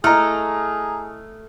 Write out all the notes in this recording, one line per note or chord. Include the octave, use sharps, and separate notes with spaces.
A3 E4 G#4 D#5 A#5 F6